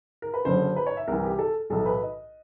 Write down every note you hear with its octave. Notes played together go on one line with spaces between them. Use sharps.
A#4
B4
F#1 F#2 D3 C5
B4
C#5
E5
C2 C3 E3 A#4
G4
A4
B1 A2 E3 A4
B4
D#5